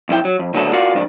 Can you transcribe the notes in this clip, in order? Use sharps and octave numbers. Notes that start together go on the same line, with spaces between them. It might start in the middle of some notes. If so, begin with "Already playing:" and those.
B1 F2 E4 G5
F#3
F2
D2 D#3 F#3 B3 D4 A4
F4 F#4 A#4 D5 F5 F#5
F2 G#2 D#3 D4